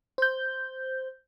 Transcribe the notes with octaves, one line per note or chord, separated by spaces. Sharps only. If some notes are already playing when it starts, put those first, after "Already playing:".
C5 G6